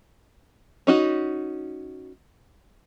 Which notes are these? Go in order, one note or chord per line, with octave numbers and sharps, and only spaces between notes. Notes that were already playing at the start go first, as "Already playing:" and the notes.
C#4 D#4 F#4